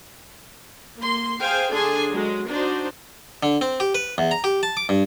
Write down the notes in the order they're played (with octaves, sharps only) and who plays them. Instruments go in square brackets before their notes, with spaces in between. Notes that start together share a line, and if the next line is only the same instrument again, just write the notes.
[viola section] A#3 C6
G#4 C5 F5 G5 G#5
D3 D4 G#4 A4 G#5 C6
F#3 G#3
D4 D#4 F#4 C5
[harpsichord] D3
C4
G4
B4
E2
A#5
G4
A5
D6
G2